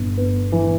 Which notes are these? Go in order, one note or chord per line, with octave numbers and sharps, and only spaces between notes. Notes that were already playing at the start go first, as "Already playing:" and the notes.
Already playing: G1
B3
E3